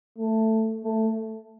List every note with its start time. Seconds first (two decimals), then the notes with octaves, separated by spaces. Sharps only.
0.18 A3
0.84 A3